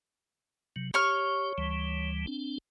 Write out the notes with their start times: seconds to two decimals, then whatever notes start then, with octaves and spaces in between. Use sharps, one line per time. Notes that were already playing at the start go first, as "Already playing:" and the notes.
0.76 C3 F#3
0.94 G4 C#5 C#6 F6
1.58 D2 E3 G3
2.27 C4 D4